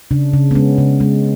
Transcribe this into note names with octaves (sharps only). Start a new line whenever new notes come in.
C#3 D4
C#3
B3
G#3 C#4
C#3
G#3